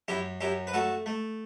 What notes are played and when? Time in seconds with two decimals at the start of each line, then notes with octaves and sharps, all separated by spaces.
0.08 F#2 E4 G4
0.41 F#2 E4 G4
0.67 B4
0.73 A3 F#4 A4
1.06 A3